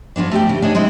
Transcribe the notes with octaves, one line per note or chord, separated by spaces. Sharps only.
F3 F#3 B3 D4
A3 G4 E5 G5
C#3
D4 D#4 G#4 C#5
G#3 C4 D#4 E4